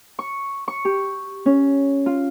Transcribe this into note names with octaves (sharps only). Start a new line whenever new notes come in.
C#6
C#6
G4
C#4
F4